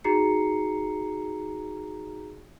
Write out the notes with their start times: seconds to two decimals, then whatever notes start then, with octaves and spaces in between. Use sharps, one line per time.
0.04 D#4 F#4 G#4 A#5 C7 C#7